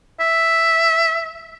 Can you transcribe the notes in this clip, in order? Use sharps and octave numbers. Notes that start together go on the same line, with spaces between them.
E5